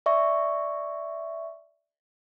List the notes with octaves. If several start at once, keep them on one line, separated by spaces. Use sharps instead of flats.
D5 E5 C#6